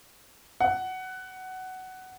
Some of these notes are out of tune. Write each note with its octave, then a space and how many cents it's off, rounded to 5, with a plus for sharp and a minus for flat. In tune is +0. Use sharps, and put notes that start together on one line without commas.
F#5 +15